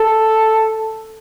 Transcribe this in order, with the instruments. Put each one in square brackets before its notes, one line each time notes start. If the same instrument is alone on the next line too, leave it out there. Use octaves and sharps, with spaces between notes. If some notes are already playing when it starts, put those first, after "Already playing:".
Already playing: [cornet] A4